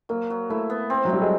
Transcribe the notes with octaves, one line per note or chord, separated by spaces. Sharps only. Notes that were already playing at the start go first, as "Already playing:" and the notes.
F#3 A#3
F#3
A3 E4
B3
C4
F#3
A2 G3
G#3